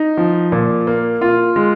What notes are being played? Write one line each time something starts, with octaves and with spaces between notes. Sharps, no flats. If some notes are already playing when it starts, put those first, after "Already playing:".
Already playing: D#4
F3
A#2
A#3
F4
G#3